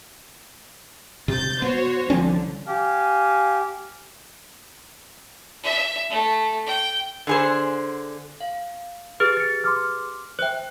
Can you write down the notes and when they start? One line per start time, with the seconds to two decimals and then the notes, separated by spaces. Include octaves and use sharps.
1.28 C3 G6 A6
1.62 B3 F#4 C5 C#5
2.10 C2 D3 F3 C4 C#4
2.67 G4 F5 G#5
5.63 E5
6.10 A3
6.66 G5
7.27 D3 G#4 C5
8.41 F5
9.20 G4 G#4 B4 F6
9.37 A6 C#7
9.64 C6 D6 F6
10.39 C5 E5 G5 F#6